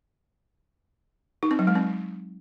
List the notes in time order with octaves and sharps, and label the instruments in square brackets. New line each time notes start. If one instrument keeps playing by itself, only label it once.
[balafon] D#4
C4
F#3
G#3
C4